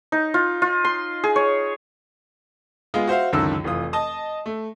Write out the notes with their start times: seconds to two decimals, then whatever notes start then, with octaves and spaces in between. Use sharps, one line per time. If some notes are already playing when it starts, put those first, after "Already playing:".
0.12 D#4
0.34 F4
0.62 F4
0.85 C6
1.24 G#4
1.36 C#5
2.94 G#3 B3 F4 G#4 D#5
3.07 F#4 C5 E5 F5
3.32 C#2 F#2 D3 D#3 A4 E6
3.64 F1 E3 F4 D#6
3.93 D#5 A5 D#6
4.46 A3